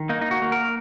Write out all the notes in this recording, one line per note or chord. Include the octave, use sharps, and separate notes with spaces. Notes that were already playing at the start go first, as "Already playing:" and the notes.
Already playing: D#3
A#3 D#4
D#4
F#4
A#3
A#4